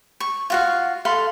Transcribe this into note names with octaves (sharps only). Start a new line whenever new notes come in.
C#6
F4 F#4 F5
A4 F5 B5 C6